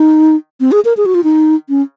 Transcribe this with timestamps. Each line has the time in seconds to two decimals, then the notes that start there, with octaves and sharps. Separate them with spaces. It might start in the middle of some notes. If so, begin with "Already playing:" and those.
Already playing: D#4
0.60 C4
0.72 G#4
0.85 A#4
0.97 G#4
1.06 F#4
1.15 F4
1.24 D#4
1.69 C#4